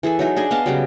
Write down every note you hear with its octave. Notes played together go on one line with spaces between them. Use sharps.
E3 G#4 A4 E5
F#3 D#4 E5
D4 G#4 D#5 G#5
B3 D#5 F5 A5
C#3 F#3 G3